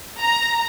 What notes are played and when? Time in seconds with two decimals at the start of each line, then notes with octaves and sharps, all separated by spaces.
0.21 A#5